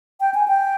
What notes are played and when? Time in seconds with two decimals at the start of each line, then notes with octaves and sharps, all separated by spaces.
0.20 G5
0.34 G#5
0.48 G5